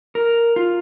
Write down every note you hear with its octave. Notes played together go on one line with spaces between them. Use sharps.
A#4
F4